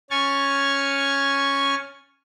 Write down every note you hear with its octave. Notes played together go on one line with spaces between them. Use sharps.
C#4 G#5 C#6 F6 G#6 A6